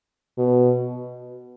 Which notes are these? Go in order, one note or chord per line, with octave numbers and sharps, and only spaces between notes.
B2